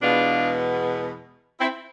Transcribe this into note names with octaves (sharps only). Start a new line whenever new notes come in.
E2 B2 G#3 B3 D4 F4
C4 E4